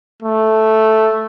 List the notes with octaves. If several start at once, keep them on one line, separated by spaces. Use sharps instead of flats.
A3